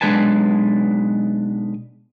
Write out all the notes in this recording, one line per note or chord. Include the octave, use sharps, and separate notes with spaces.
B1 G#3 D4 B4 G#5 A5